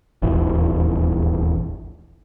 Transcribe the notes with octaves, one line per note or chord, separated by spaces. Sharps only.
D#1 G#1 E2